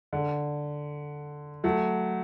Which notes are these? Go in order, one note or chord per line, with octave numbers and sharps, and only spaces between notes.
D3
F#3 A3